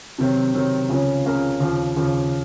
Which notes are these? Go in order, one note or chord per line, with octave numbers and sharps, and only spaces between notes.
C3 D#3 F#3 C4
C3 D#3 F#3 C4
C#2 C#3 F3 A#3 C#4
C#2 C#3 F3 A#3 C#4
D#2 C#3 F3
D#2 C#3 F3